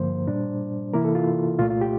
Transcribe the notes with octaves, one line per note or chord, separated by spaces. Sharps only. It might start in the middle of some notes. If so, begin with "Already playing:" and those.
Already playing: G2 D3 F3 A#3 C5
A#2 G3 D4
C3 E3 A#3 E4 A#4
A4
F4
C2 A#2 A3 F4
F4
G4